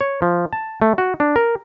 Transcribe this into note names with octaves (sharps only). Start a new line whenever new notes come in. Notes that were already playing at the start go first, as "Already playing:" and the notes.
C#5
F3
A5
A3
F#4
D4
A#4